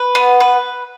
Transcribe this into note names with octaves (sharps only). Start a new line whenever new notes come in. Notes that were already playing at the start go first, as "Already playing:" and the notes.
Already playing: B4
B3
B4